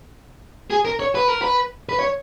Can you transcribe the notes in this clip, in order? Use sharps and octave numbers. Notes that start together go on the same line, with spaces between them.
G#4
A#4
C#5
B4
A#4
B4
B4
C#5